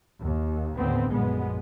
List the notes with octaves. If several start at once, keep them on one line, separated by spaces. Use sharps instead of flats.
D#2
D#2 A2 D3 B3 C4
A#1 F#2 G#3 B3